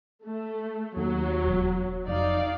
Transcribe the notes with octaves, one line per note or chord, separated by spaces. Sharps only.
A3
D#2 F#3
E1
F1 D#4 D5 F5